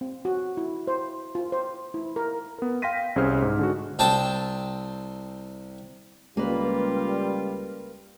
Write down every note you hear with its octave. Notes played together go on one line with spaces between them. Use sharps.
C4
F#4
E4
C5
F4
C5
E4
A#4
B3 A#4
F5 G5 C6 A#6 B6 D#7
C2 C#4 G#4 C5 F6
G#2
D3 G#3 F#4
C2 C4 G5 A5
C#2 G3 A#3 F4 B4